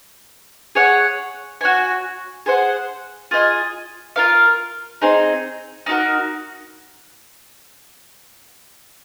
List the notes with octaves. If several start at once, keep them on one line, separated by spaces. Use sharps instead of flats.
G#4 C#5 F#5
F#4 C#5 G#5
G#4 C5 F#5
F4 G#4 D#5 G#5
F4 A#4 F5
C4 D#4 G#4
D#4 F#4 A#4